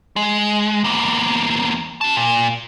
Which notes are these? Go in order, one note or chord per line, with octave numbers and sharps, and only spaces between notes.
G#3
E2 A#3
F#4 A5
A#2